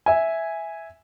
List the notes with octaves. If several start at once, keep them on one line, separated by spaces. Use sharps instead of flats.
E5 G#5